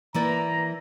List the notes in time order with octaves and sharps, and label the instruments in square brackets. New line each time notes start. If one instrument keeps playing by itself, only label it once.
[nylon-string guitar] E3 A#3 D5 [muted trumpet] A#5